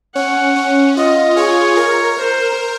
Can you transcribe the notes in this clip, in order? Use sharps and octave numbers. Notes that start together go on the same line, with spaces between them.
C#4 F#5
C#4
F4 D#5
G#4 C#5
A#4
C5